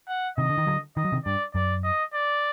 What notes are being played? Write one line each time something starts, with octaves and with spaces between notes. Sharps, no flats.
F#5
C3 D#3 D#5
D3
D#3
D3 F#3
D#3 D#5
F#3
C3 D#3
G2 D5
F#2 D5
D#5
D5